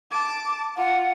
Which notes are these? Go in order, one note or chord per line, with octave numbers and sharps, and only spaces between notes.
A5 D6
F4 F#5